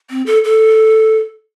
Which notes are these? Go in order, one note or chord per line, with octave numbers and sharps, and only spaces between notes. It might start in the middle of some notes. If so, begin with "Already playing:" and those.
C4
A4
A4